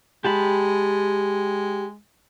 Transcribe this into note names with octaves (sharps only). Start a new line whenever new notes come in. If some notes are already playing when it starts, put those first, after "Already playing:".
G#3 G4 A5 B5